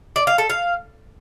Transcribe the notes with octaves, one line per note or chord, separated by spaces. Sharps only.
D5
F5
A4
F5